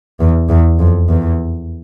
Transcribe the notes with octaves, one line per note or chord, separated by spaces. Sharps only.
E2
E2
F2
E2